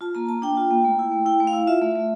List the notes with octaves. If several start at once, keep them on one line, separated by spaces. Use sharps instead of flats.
F4 A5
A#3 A#5
A#3 A5
D4 G5
F4
A#3
A3
E4
A3
E4 G5
A3
F5
E4
F4 E5
A3
A3